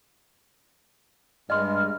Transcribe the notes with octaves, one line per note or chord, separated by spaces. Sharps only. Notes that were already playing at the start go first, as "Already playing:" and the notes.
G2 G#3 D#5 C6 F6